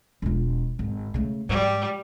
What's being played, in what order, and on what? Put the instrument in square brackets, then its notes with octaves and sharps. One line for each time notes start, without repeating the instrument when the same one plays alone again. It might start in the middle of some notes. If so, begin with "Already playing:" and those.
[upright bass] E1 F4
G#1
C#3 A3
[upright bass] G#2 [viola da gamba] G3